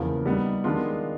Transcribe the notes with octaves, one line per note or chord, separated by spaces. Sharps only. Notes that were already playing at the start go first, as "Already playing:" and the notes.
Already playing: E2 C#3 F3 A#3
G3 B3 D#4
D#3 G#3 B3 D4 F4